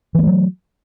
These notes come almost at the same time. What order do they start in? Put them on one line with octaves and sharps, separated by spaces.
E3 A#3 A3 F#3